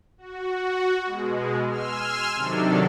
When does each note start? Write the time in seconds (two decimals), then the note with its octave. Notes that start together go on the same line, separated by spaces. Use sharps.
0.18 F#4
1.04 B2 G#3
1.68 G#5 C6 E6 F6
2.33 C3 D#3 F#3 D4 A4